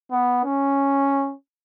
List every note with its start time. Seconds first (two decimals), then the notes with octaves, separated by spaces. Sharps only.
0.11 B3
0.44 C#4